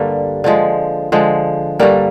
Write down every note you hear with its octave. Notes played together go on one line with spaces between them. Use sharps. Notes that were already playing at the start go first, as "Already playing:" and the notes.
Already playing: G2 D3 G3 A#3
D3 F3 G#3
D3 F3 G#3
G2 D3 G3 A#3